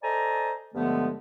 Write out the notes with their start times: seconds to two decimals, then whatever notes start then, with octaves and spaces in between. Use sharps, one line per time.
0.03 A4 C5 D5 D#5 G#5 A#5
0.75 G2 D3 F3 G#3 A3 B3